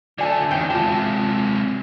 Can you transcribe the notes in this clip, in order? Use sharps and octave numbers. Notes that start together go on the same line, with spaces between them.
D3 A3 D5 G#5 A5
E2 D#3 C#4 G5
C3 G#3 F4 A5